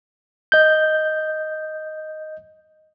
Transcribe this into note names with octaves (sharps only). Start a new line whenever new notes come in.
D#5 G6